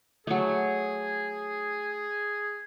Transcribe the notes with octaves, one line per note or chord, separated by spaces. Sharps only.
F#3 A3 G#4